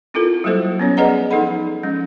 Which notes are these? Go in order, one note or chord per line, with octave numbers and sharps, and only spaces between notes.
C4 E4 F4 A4 A#4
F#3 G3 A#3 F#4 A4 C5
B3 C#4 C#5
G#4 B4 D5 D#5 F#5 A#5
F3 D#4 A4 F#5 B5
F3 G#3 C#4